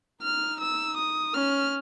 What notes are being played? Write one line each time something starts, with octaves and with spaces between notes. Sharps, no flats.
D#4 F6
E6
D#6
C#4 F6